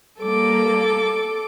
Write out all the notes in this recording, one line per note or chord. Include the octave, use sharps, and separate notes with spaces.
G3 A#3 A4 D6